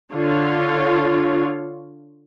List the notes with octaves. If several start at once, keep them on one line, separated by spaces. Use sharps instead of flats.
D3 F4 C#5